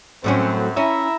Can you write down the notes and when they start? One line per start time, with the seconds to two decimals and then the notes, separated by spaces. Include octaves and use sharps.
0.24 F#2 A2 F#3 C4 C#4
0.77 C#4 E4 E5 A#5